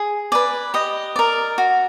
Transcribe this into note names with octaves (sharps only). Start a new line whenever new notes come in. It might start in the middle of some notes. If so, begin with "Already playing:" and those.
Already playing: G#4
B4 D5 G#5
G4 D#5
A#4 D5
F#4